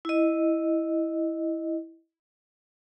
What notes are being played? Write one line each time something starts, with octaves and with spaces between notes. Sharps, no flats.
E4 D#5